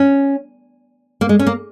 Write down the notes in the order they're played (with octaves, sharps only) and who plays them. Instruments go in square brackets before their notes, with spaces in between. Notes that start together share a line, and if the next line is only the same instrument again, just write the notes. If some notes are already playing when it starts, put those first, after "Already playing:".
Already playing: [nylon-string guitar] C#4
A#3
G#3
C#4
A#3